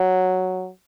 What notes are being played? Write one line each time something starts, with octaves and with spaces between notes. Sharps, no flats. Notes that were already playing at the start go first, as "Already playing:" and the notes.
Already playing: F#3